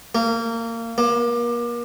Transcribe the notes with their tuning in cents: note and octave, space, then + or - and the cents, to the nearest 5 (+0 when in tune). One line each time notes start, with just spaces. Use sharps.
A#3 -25
A#3 +35